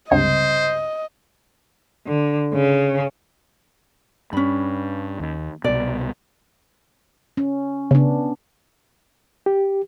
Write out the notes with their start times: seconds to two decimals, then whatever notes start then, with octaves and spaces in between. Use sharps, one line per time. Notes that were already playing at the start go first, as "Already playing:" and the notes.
0.11 C#2 G2 C3 C5 D#5
2.07 D3
2.54 C#3
4.33 G2 C#4 B5
5.20 D#2
5.64 C2 B2 D5
7.37 C#4
7.91 C#3 B3 D4
9.46 G4